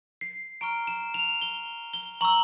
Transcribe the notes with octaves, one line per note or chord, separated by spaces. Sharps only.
C7
A#5 C#6 F6 D7
E7
F7
G7
G7
A#5 C#6 E6 F#7